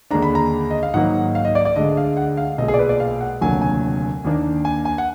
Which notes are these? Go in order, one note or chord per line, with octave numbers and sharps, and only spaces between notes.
D#2 D3 G#3 D4 A#5
B5
A#5
D#5
F5
G#2 D#3 F#3 A#3 D#4 F#5
F5
D#5
D5
D5
D2 D3 G#3 D#5
F5
F#5
F5
B1 A#2 G#3 D#5
G#4
D5
B4
D5
F5
F#5
F1 D#2 D3 F#3 G#5
G#5
D#2 D#3 A#3 D4
G#5
G#5
F#5